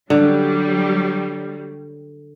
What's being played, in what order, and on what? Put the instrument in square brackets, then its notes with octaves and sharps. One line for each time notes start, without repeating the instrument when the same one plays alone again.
[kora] D3 [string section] F#3 G3